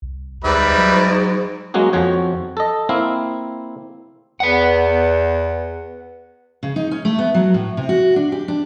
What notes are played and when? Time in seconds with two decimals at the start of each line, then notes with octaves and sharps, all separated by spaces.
0.02 C2
0.44 D2 G#2 G3 B4 E5
0.78 F#3
1.74 F#3 G#3 A#3 C#4 F#4 G#4
1.93 F2 F3 F#4 C#5 G5
2.57 A4 D#5
2.89 A#3 C4 E4 F5
4.40 E2 B4 F#5
6.63 C#3
6.76 D#4
6.91 C#4
7.05 A3
7.19 B3
7.34 F#3
7.54 A2
7.77 C3
7.89 F#4
8.16 D4
8.32 G4
8.48 D4